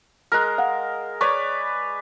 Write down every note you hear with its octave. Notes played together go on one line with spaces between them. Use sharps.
G#3 A#4 F6 F#6
F5 F#5
B4 C#5 D5 C#6